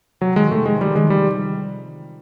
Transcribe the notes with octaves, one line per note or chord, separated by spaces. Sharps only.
C3 F#3
D#3 G#3
C3 A3
F1 G#3
D#3 G3
D#3 G#3
G3